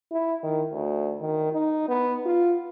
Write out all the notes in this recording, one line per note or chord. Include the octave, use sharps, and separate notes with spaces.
E4
D#3
D2
D#3
D#4
B3
F4